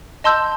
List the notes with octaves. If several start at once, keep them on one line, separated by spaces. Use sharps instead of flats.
D#5 A5 C6 E6 G6